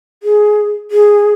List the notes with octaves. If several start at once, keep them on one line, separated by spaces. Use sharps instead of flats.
G#4
G#4